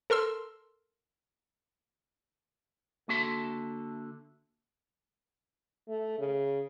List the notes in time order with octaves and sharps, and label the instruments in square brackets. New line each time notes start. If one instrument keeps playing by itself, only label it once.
[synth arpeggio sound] A4 A#4 C6 E6
[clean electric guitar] D3 A#3 F#4 A4 E5 C6
[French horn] A3
C#3